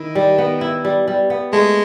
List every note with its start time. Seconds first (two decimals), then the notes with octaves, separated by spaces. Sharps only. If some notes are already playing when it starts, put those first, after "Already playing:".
Already playing: D#3 E4
0.15 G3
0.38 B3
0.61 E4
0.85 G3
1.08 G3
1.30 B3
1.53 G#3 A3